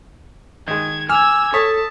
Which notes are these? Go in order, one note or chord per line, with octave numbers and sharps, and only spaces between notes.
D#3 G#3 G#6
G#5 D6 E6 F6 G#6 F7
A4 C#5 A5 D#6 B6